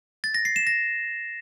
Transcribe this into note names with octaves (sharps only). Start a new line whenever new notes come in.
A6
A#6
C7
E7
A#6